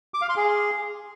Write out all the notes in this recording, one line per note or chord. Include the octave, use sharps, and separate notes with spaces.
D6
F5
C6
G#4